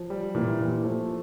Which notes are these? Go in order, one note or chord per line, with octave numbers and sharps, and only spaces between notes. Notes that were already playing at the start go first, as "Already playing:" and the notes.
Already playing: F3
G3
A#2 E3
A#2 E3
F3 A3